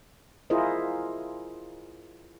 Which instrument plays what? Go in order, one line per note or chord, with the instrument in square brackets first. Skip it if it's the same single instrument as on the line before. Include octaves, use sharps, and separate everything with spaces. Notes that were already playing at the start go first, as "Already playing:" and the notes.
[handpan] E4 F4 G#4 A#4 C5 D#5